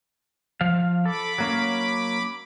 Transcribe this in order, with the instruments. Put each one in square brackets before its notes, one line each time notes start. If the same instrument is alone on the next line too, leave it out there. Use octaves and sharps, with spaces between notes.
[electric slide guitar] F3 F5
[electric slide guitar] A4 [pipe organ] B5 D6
[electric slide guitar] F#3 A#3 C#4